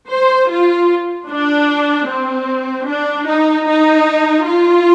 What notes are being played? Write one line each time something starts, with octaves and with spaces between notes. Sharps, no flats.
C5
F4
D4
C4
D4
D#4
D#4
F4